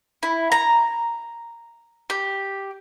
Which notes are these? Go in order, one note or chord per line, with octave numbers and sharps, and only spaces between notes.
E4
A#5
G4